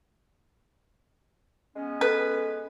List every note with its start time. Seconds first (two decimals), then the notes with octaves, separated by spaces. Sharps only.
1.76 G#3 B3 C#4
2.01 A4 B4